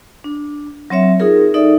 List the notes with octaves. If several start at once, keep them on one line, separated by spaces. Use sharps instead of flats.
D4
F#3 C4 C#5 E5
D#4 F4 G#4 A#4
D#4 A4 D5 E5